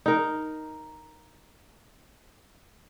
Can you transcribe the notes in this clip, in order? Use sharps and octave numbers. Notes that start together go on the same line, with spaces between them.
D#4 A#4